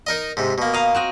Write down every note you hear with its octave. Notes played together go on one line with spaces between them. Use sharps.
D#4 A#4 D#5
G#2 C3
B2 A#3
D#5 F5 A#5
C4 F#4 D#5